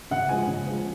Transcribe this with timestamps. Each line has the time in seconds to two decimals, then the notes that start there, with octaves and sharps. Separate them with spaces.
0.11 C#3 F#5
0.29 F3 G#3 G#5
0.47 C#3
0.67 F3 G#3